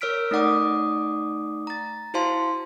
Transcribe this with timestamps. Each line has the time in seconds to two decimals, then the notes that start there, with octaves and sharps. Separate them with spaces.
0.01 A#4 C#5 E6 F6 B6 D7
0.31 A3 D#4 D5 F#5 D6 D#6
1.67 A#5 A6
2.14 E4 F#4 C5 F5 A5 C6